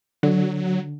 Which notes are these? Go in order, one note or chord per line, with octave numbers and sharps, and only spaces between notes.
D3 F#3